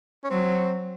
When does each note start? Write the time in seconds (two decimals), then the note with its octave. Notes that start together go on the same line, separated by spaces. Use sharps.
0.24 C#4
0.30 F#3 C4